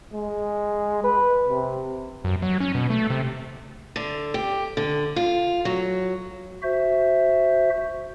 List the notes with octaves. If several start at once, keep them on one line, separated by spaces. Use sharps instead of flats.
G#3
B4
C3
F#2
F#3
C#4
B2
A3
C3
D3
G4
D3
F4
F#3
F#4 C5 E5